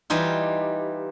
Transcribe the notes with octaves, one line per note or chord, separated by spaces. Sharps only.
E3 G3 D#4 F4